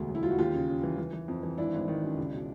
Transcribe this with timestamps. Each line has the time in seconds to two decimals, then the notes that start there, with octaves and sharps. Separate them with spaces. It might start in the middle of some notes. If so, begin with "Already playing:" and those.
Already playing: E1 D2 B2
0.09 F#3
0.15 E4
0.23 F#3 F4
0.31 F#4
0.39 D#2 F4 G4
0.53 C#3
0.69 C#3
0.83 E3
0.98 E3
1.13 E3
1.28 F2
1.43 E3
1.58 G#1 D4 E4
1.73 G#1
1.88 D#3
2.03 F#2
2.18 C#2
2.33 B2